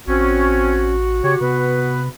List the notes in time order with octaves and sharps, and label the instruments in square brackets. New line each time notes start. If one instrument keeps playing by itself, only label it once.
[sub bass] A1 [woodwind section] C4 C#4 [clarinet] F#4
[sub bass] C#3 [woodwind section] G4 C#5
[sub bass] C3 [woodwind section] B3 B4